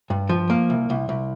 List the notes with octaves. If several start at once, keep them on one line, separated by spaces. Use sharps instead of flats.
G2
F3
A#3
C2
C2
C2